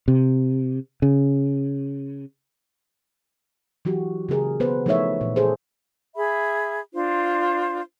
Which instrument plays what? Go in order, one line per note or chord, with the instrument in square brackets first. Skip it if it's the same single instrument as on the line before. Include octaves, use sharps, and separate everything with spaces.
[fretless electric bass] C3
C#3
[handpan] E3 F#3 F#4 G4
C#3 A#3 G#4 A#4
B3 B4 C5
F3 A3 D#4 A4 C#5 E5
A#2 E3
G#4 A4 C5
[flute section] G#4 E5 B5
D4 F4 C5